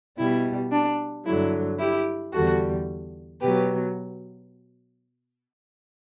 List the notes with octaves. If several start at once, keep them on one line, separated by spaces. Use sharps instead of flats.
B2 G3 E4
D4
G2 D3 F#3 E4
E4 G4
E2 D3 G3 F#4 A4
B2 F#3 G4 B4